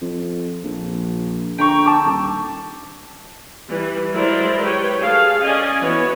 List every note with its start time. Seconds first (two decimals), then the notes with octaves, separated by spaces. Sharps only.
0.01 F2
0.64 A#1
1.58 D3 G5 A#5 C#6
1.84 A5 D6 E6
2.05 D#1
3.69 E3 G3
4.13 F#3 G#3 E4 A#4 C5 D5
4.63 G4 B4 C#5 G5
4.99 G#4 A4 F5
5.43 C#4 D5 D#5 G#5
5.83 E3 B3 F#4 C#5